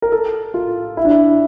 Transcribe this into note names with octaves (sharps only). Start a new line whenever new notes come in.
A#4
A4
F4
E4
D4
E4